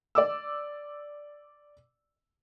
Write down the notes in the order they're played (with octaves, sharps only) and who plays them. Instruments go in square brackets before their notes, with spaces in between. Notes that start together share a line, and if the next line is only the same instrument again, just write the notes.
[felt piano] D5 D6 E6